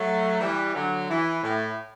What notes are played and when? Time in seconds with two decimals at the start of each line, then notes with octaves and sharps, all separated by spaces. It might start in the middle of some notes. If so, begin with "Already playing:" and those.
Already playing: F#3 A3
0.40 E3 G3
0.75 D3 F#3
1.09 E3
1.43 A2